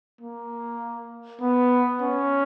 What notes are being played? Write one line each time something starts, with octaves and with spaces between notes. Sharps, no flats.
A#3
B3
C#4